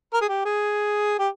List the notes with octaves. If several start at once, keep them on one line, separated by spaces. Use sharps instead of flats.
A#4
G#4
G4
G#4
G4